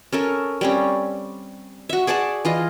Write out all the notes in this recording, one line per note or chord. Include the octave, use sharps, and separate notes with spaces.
C#4 A4 A#4
G3 C4 C#4
F#4 E5
G#4 D5 F#5 A5
E3 F4 D#5